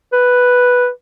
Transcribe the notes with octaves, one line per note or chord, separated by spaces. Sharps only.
B4